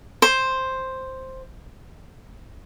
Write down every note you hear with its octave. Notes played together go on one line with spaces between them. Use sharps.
C5